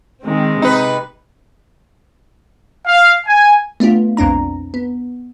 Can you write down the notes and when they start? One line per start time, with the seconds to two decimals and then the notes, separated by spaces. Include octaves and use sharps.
0.23 D#3 G#3 C4
0.62 C3 D#4 B4
2.86 F5
3.27 G#5
3.80 A3 B3 D4 F4
4.17 B1 F2 C4 D4 A#5
4.74 B3